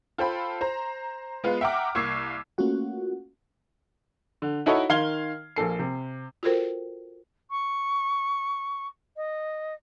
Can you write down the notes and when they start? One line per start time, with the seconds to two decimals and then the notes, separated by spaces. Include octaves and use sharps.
0.18 F4 A4 C5 G5 B5
0.61 C5 A#5
1.44 G#3 B3 F4 B4
1.61 E5 F#5 G5 A#5 D6 F6
1.95 C2 A#3 C#6 E6 G#6 C7
2.58 A3 A#3 C#4 F4 F#4 F#5
4.42 D3
4.66 D#4 E4 F#4 A4 C#5 D#5
4.89 D#3 F5 C6 F6 G#6 G7
5.56 A#1 A#3 A4 C7
5.79 C3
6.43 F4 F#4 A4 A#4 C5 G5
7.50 C#6
9.16 D#5